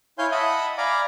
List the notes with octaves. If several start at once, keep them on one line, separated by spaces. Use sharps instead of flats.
E4 C#5 F5 G#5 C6 G6
D#5 E5 F#5 A5 B5 D#6
D5 F5 G#5 A#5 B5 D6